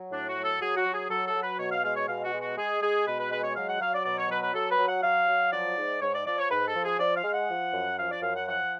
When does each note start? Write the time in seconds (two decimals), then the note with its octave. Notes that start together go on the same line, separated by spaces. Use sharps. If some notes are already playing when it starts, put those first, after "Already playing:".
Already playing: F#3
0.11 A2 D4
0.28 F#4
0.36 F#3
0.44 A4
0.61 F#3 G#4
0.77 F#4
0.86 F#3
0.94 G#4
1.10 F#3 A4
1.27 A4
1.35 F#3
1.43 B4
1.59 B2 C#5
1.72 F5
1.84 G#3 F5
1.96 C#5
2.08 B2 F5
2.24 F#4
2.33 G#3
2.41 F#4
2.57 G#3 G#4
2.82 G#3 G#4
3.06 B2 B4
3.19 B4
3.31 G#3 B4
3.44 C#5
3.56 F#3 F5
3.69 F#5
3.80 F#3 F5
3.93 D5
4.05 B2 D5
4.17 C#5
4.30 F#3 B4
4.42 B4
4.54 F#3 A4
4.71 B4
4.78 F#3
4.87 F#5
5.03 F#3 F5
5.28 F#3
5.53 F3 D5
5.78 G#2
6.02 G#2 C#5
6.14 D5
6.26 F3 D5
6.39 C#5
6.50 G#2 B4
6.67 A4
6.76 F3
6.84 G#4
6.99 F3 D5
7.16 F5
7.24 G#3
7.33 F#5
7.49 F3
7.74 F#2
7.99 F3 F5
8.11 D5
8.23 F#2 F5
8.35 F#5
8.48 F3 F#5